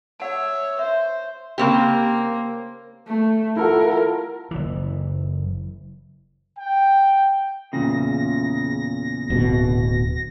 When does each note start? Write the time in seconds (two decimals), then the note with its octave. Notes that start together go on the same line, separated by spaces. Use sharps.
0.20 C#5 E5 F#5 A5
0.79 C5 E5
1.58 C#3 A#3 C4 G4
3.08 A3
3.56 E4 F4 A4 A#4 F#5
4.51 F#1 E3
6.58 G5
7.73 E2 A#2 C#3 A#6
9.30 D1 B2